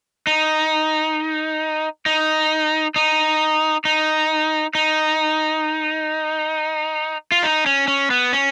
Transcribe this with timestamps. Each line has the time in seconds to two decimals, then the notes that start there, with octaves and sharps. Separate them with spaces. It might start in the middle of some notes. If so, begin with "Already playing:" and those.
0.27 D#4
2.06 D#4
2.96 D#4
3.85 D#4
4.75 D#4
7.32 F4
7.43 D#4
7.66 C#4
7.88 C#4
8.11 B3
8.33 C#4